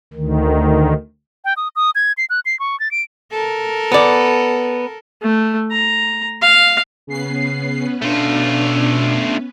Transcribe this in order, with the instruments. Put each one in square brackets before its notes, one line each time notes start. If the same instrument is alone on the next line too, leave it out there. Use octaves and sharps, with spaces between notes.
[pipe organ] D2 D#3
[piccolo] G5
D#6
D#6
G#6
C7
F#6
C7
C#6
A6
D7
[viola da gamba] A4 A#4
[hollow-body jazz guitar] B3 D5
[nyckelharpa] A3
A#5
F5
[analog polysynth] C#3 C7 [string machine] B3 C#4 B4
[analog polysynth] B2 [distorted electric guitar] A3 F4 [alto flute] D4